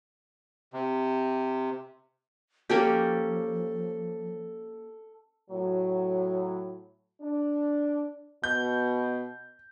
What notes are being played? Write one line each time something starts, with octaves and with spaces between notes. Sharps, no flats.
C3
F3 A#3 C#4 G4 A4
A2 F#3
D4
B2 G6